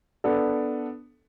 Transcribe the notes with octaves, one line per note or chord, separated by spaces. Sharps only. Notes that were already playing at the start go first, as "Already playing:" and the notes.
B3 D4 A4